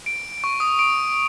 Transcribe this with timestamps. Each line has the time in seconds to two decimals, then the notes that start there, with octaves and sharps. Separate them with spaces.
0.06 D7
0.44 C#6
0.60 D#6
0.79 D7